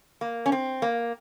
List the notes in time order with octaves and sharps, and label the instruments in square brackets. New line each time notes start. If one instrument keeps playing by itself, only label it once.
[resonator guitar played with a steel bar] A#3
C#4
C4
A#3